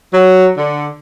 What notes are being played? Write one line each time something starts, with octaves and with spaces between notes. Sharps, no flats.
F#3
D3